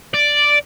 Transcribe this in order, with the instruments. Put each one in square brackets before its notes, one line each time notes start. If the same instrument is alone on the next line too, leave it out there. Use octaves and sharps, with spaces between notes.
[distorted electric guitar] D5